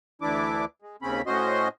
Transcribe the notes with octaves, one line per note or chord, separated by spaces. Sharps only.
D2 E3 D4 E4 D6
G#3
D#2 C#3 C4 C#4 B5
A2 C#4 F#4 C5 D#5 C6